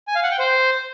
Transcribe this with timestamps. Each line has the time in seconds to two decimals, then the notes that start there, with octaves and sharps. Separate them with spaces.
0.07 G#5
0.15 F5
0.23 F#5
0.31 G5
0.39 C5